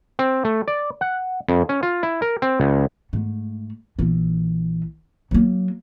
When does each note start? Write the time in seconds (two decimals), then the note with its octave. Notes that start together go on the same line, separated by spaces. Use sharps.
0.19 C4
0.45 A3
0.68 D5
1.01 F#5
1.48 F2
1.69 C#4
1.83 F4
2.03 E4
2.22 A#4
2.42 C4
2.60 C#2
3.13 G#2 A3
3.99 A#1 E3
5.31 F#3 A#3